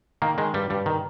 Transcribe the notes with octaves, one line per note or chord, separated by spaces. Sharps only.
D#3 A#3
D#3 G#3
G2 G3
G2 G3
D#3